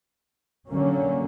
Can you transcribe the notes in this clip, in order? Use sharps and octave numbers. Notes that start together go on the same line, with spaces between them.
D3 F#3 A#3 C#4